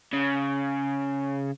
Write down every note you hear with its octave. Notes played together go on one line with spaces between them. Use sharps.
C#3